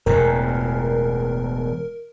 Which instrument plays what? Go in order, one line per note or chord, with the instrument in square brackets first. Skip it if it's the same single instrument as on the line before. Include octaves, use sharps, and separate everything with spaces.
[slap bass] E1 E2 A2 [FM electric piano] A#4